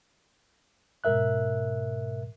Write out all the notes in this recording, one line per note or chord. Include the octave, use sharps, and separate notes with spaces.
G#2 B2 A#4 E5 F#6